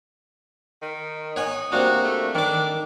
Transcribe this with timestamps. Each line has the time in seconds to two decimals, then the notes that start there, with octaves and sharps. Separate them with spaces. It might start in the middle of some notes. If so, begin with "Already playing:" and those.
0.82 D#3
1.36 D#4 C#5 F#5 G#5
1.72 C3 A#3 D4 F#4
2.04 A3
2.35 D#3 D4 D6